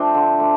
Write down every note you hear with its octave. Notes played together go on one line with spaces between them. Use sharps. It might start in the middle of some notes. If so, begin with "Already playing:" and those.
Already playing: F3 A3 C4 D4 C5
D3
A3